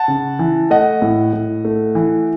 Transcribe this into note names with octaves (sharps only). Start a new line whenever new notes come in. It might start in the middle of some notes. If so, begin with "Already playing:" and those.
Already playing: F#5 A5
C#3
E3
A3 D#5 F#5
A2
A2
A3
E3